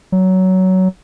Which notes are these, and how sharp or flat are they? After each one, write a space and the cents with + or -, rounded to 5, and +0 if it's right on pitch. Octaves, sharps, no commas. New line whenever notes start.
F#3 +15